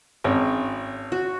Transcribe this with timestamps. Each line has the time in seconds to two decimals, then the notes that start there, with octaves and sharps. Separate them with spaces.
0.24 G#1 C#4
1.12 F#4